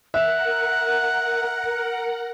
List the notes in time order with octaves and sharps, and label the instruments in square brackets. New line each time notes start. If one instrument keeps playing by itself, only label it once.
[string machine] A#4 F#5 [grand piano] E5 [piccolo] F#6